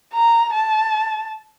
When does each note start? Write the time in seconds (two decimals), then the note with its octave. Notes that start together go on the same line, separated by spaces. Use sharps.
0.14 A#5
0.54 A5